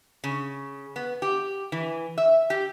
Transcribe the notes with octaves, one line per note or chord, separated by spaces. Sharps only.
C#3
B3
G4
E3
E5
G4